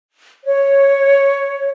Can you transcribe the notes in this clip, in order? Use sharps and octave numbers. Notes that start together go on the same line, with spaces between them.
C#5